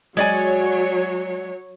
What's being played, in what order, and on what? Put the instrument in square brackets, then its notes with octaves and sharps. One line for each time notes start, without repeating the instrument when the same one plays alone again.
[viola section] F#3 C#5 [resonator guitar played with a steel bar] G#3 D5 G#5